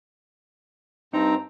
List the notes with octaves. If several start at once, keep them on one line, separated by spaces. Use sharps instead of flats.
G2 C4 D#4 A#5